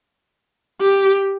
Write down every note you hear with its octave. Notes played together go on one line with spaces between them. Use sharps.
G4